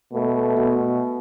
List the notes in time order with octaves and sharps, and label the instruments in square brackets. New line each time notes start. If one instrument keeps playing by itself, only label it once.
[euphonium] B2 [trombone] A3
[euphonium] B2